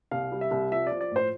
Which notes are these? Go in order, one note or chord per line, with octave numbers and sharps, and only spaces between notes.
C2 F5
G3
E5
C2
F3 E5
F3 D5
D5
A2 C5